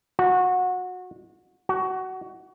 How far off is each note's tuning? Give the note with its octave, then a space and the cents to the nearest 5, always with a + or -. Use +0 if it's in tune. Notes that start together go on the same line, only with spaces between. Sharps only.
F#4 -20
F#4 +20